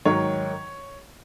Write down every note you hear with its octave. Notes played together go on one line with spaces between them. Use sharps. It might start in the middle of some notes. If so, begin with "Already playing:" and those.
G#2 D#3 F#3 C#5